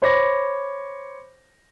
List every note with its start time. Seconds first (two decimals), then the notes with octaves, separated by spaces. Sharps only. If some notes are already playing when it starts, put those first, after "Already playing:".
0.02 C5 C#5 B5 D6 A#6